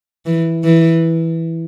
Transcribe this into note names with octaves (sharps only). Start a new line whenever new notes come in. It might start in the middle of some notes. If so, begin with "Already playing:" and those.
E3
E3